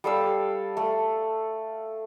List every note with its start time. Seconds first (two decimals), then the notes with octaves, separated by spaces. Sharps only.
0.04 G3 A4 F5 E6
0.77 A3